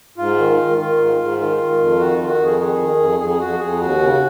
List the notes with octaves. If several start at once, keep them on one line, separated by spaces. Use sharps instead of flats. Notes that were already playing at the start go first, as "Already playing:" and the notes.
G#2 F4
D#3
D#3
D#3 F4
G#2
G#2
D#3 F4
D#3
F2
D#3 F#4
D#3 F4
F#4
F2
G#4
D#3 G#4
D#3
F2
F2 G#4
G#4
F2 F#4
F2 G#4
D#2 F#4
C#3